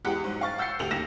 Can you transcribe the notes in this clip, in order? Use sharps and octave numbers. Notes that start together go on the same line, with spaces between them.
E2 G#3 G4 F#5 F#6 C#7
G#2 F#3
F5 C#6 A6
F#5 E6 G6 A6 C7 C#7
D2 G4 F7
D#2 A#3 A#6 E7